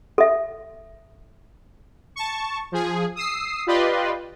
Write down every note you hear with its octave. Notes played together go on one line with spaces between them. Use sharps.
A4 E5
A5 C#6
F3 G#4
D#6 E6 C7
F4 G4 B4 D5 D#5 C6